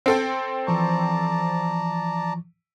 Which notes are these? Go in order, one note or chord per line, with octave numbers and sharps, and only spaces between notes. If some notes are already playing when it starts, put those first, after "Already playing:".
C4 A4 G5
E3 F3 D5 A5 A#5 C#6